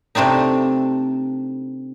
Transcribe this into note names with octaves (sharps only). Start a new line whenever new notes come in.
C3 A3 C4 D4 D#4